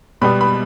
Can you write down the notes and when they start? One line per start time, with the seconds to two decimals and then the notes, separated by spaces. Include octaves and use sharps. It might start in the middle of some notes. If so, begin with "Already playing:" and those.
0.21 B2 G3 B3 B5
0.41 B5